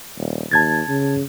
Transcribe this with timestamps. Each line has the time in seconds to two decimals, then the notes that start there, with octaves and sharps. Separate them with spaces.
0.17 D#1
0.51 D#2 A5 G#6 A6
0.88 C#3